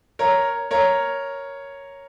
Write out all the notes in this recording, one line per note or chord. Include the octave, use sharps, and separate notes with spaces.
A#4 C#5
A#4 C#5